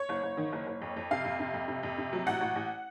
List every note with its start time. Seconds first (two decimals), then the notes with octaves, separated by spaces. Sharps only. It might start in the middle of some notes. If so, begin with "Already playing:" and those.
Already playing: C#5
0.09 F#1
0.23 F#1
0.37 D#3
0.52 F#1
0.67 F#1
0.82 F2
0.96 F2
1.11 C3 F5
1.25 F2
1.40 C3
1.54 F2
1.68 C3
1.83 F2
1.98 C3
2.13 F#3
2.26 A1 F#5
2.41 A1
2.55 A1